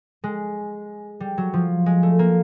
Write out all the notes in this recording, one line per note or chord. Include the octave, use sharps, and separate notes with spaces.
G#3
G3
F#3
F3
G#3
A3
A#3